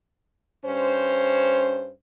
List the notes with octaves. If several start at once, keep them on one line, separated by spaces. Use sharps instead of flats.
G2 C#4 C5